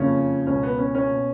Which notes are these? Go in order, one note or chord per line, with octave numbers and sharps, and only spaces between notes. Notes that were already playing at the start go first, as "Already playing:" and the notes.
Already playing: F#1 F2 C#3 F3 C#4
C#2 B2 C#4
B3
C#4
C#4
B2